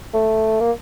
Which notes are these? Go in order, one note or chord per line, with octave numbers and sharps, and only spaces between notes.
A3
A#3